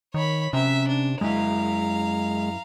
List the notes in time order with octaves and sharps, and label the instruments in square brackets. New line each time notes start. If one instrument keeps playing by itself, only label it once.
[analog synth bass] D#3 [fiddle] C#5 B5
[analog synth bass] C3 [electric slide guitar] C#4 A#5 [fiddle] E5
[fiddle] D4
[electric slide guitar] F#2 E4 [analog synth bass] G#3 [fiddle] F5 A#5